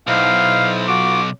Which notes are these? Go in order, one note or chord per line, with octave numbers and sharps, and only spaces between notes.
B1 D#4 E4 C5 F5
F4 F#4 D6